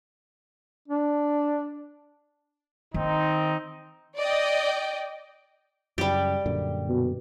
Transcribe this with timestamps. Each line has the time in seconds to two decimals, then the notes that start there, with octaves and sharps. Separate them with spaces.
0.88 D4
2.94 D#3 C4 D#4
4.18 D5 D#5 G5
5.98 F#2 C#3 G3 G4
6.46 F#2 A#2 D3
6.89 B2